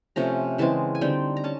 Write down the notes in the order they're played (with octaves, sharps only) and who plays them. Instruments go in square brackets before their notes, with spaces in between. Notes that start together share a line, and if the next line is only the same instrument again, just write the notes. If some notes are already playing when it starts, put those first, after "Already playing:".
[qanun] C3 F3 A3 C#4 A#5
C#3 E3 G#3 C4 A5
G#5
D3 G3 C4 D#4 G5
A#5
C#4 A5